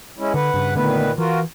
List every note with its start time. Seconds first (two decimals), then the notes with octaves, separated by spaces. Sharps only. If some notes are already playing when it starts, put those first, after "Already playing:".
0.18 G#3 C#4 E4
0.34 D3 B4 F#5
0.54 G2 C#3
0.75 A#2 D3 D#3 A3 B3 B4
1.18 E3 F4 F#4 A#4